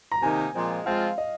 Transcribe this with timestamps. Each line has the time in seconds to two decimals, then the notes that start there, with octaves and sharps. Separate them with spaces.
0.12 A#5
0.22 C3 D#3 A#3 D#4 G#5
0.55 A#2 F3 G#3 C4 F4
0.86 F3 G#3 C4 F4 F5
1.18 D#5